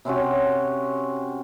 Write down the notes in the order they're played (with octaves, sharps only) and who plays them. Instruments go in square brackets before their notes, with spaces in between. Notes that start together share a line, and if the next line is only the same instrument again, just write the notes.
[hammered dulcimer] C3 C4 C#4 F#4